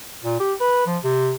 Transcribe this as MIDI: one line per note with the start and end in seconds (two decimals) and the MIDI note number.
0.24 0.38 46
0.40 0.54 67
0.60 0.84 71
0.87 0.98 53
1.04 1.33 48